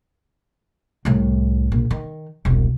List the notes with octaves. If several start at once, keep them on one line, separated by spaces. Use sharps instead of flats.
C2 A2
A#1
D#3
E1 C2